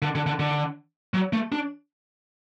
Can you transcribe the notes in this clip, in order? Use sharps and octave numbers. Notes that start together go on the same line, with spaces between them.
D3
D3
D3
D3
F#3
A3
D4